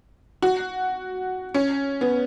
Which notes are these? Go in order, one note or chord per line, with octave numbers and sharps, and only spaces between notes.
F#4
C#4
B3